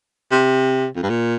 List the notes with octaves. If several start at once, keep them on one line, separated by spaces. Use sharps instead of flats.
C3
F2
G2
A#2